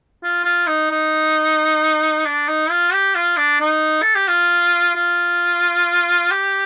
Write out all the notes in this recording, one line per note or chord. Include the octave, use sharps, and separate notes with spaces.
F4
F4
D#4
D#4
D4
D#4
F4
G4
F4
D4
D#4
A4
G4
F4
F4
G4